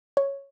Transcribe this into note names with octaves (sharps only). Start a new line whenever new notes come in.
C#5